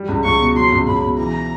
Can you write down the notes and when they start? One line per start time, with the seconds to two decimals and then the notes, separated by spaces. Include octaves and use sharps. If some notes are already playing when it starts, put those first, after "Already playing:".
Already playing: G3
0.08 C#2
0.24 C#2 C#6
0.40 B2
0.55 F#3 C6
0.72 C#2
0.87 C#2 B5
1.03 B2
1.18 E3 A#5